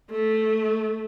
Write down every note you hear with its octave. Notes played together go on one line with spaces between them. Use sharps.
A3